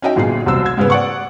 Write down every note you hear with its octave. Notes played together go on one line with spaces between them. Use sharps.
C#4 D#4 F#4 D#5 E5 G5
G1 A#2 G#4 C7
E1 C2 F#2 C3 C4 E6
G#6
G#2 C#3 G3 B3
D5 F#5 C#6